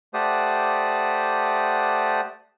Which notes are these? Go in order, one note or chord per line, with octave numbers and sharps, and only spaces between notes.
A3 G4 C5 D5 F#5 D#6